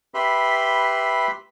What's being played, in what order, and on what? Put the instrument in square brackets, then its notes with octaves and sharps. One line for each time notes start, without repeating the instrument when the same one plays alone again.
[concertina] G4 B4 E5 B5 C6